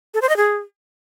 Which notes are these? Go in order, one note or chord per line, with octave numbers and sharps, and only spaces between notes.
A4
C5
D#5
G#4